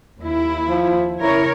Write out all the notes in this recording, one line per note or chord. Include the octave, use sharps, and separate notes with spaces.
D#2 E4
F3
C#3 E4 A#4 C#5